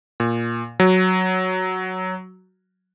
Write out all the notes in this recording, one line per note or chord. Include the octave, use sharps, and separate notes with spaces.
A#2
F#3